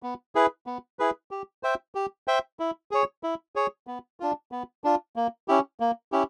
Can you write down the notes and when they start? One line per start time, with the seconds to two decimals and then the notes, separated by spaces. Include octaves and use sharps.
0.03 B3
0.35 E4 G#4 B4
0.67 B3
0.99 E4 G#4 B4
1.31 G4
1.63 C5 E5 G5
1.95 G4
2.28 C5 E5 G5
2.60 E4
2.91 G#4 C#5
3.23 E4
3.56 G#4 C#5
3.87 B3
4.20 D4 F4
4.52 B3
4.84 D4 F4
5.16 A#3
5.48 C#4 E4 G4
5.80 A#3
6.12 C#4 E4 G4